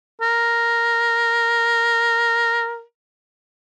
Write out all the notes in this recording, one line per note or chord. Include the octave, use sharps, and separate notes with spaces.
A#4